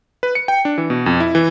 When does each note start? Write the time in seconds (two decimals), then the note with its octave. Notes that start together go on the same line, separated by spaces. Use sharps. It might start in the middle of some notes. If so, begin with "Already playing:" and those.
0.23 B4
0.35 C#7
0.48 G5
0.65 D4
0.78 E3
0.90 B2
1.06 F2
1.20 E4
1.35 E3